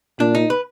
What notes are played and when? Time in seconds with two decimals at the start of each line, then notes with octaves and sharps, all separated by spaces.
0.20 A#2 D4
0.35 D#4
0.50 B4